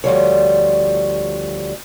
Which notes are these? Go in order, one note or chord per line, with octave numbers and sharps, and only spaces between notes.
D2 F3 G3 C#5